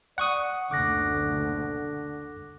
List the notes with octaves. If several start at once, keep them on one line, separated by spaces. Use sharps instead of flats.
D5 F#5 C#6 D#6
F#1 D2 B2 D3 D6 F#6 A#6